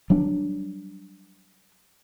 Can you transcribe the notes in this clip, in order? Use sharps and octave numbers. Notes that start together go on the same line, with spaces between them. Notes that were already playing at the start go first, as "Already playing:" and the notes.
F#3 G3 D4